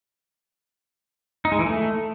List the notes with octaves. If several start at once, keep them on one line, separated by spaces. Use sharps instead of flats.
D#4
G#3
E3
A3